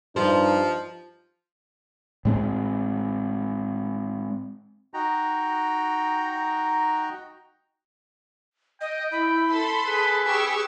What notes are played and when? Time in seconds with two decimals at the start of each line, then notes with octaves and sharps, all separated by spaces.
0.16 G2 F3 D#4 C5
2.25 A2 G#3 C4
4.94 D#4 F#4 G5 A#5
8.81 D#5 G5
9.12 E4 B5
9.50 A4 C6
9.86 G#4 B4
10.25 G4 C#6 E6